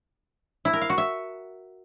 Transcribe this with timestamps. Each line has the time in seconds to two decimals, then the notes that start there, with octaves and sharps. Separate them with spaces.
0.65 E4
0.73 A#4
0.81 F5
0.90 F#4
0.98 E5